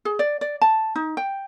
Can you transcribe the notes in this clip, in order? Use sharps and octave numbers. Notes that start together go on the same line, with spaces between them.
G#4
D5
D5
A5
D#4
G5